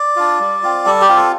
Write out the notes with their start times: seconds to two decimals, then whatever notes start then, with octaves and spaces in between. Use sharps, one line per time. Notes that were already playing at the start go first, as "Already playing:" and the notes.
Already playing: D5
0.16 D4 F4
0.40 G3
0.63 C4 F4
0.86 G3 A4
1.01 G4
1.09 C4 F4
1.17 A4